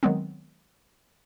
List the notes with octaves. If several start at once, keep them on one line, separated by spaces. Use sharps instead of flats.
D#3 F#3 G#3 B3 C4